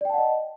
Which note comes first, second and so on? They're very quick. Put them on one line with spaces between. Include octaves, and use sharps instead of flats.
D5 G5 A5 F#5 D#5